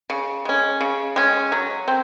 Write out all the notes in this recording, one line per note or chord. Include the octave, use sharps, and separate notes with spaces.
C#3
G#3 C#4
C#3
G#3 C#4
F#3
C4